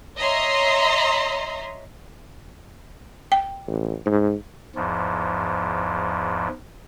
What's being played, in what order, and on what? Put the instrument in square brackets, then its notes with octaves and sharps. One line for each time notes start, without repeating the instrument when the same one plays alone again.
[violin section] C#5 D#5 E5 A#5 C6
[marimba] G5
[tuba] A1
G#2
[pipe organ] E2 G#2 F3